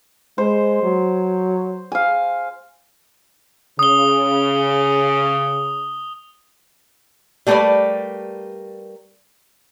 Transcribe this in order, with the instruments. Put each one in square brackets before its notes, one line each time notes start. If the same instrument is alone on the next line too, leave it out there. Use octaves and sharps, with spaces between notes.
[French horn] G#3 [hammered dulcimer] C5
[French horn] F#3
[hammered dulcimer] F5 G#5
[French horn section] C#3 [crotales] D#6 G7
[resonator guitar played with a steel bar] G3 A3 A#3 G#4 B4 D5